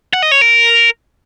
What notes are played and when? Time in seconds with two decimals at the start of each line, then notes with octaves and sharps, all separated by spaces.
0.13 F#5
0.22 D#5
0.31 C#5
0.41 A#4